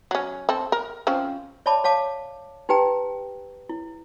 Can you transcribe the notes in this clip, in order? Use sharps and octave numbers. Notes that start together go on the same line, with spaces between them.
F#3 C#4
C4 A4
A#4
F3 C4 C#4
C#5 D5 E5 A5 B5 D6
C#5 F5 A5 D6
D#4 G4 B4 G5 A#5
E4